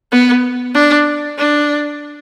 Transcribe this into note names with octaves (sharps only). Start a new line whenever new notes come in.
B3
D4
D4